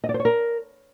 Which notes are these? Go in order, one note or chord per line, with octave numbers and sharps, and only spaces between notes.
D#5
D5
C5
C#5
A#4